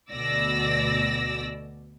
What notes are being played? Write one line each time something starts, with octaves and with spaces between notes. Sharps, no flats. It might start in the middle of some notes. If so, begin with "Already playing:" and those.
D2 B2 D5 E6 A#6